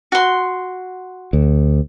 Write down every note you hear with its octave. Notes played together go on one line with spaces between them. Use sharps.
F#4 C6
D2